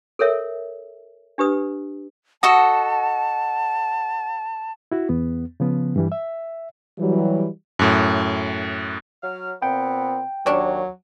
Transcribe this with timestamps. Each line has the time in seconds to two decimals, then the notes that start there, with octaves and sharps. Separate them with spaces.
0.19 A4 A#4 C#5 E5
1.38 D4 G4 B4 D#6
2.43 F#4 A4 D#5 F#5 A5
4.92 E4 F#4
5.09 E2 B3
5.60 C#3 F3 B3
5.96 G2 E3 G3
6.12 E5
6.99 E3 F#3 G3
7.79 F#2 A2
9.23 F#3 F6
9.62 A#2 B3 C4 G5
10.46 D#2 F#3 C#4 D4